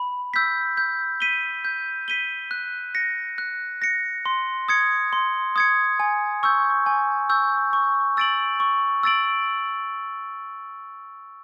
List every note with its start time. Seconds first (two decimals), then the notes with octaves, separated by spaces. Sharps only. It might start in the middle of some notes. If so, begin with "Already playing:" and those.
Already playing: B5
0.34 E6 G6 B6
0.77 G6
1.20 B6 D#7 G7
1.65 G6
2.08 B6 D#7 G7
2.51 F#6
2.95 A#6 C#7
3.38 F#6
3.82 A#6 C#7
4.26 C6
4.68 D#6 G#6 C#7
5.13 C6
5.56 D#6 G#6 C#7
6.00 G#5
6.43 C#6 E6 G6
6.86 G#5
7.30 C#6 E6 G6
7.73 C#6
8.17 E6 A6 D7 F#7
8.60 C#6
9.03 E6 A6 D7 F#7